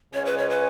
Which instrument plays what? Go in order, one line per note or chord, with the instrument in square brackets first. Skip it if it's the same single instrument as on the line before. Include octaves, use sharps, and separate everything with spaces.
[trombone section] C#2 C#3 G#3 C#4 [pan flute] C#5
[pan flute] B4
C#5
B4